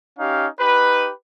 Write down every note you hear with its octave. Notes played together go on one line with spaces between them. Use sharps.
C#4 D#4 G4 F5
D#4 G4 B4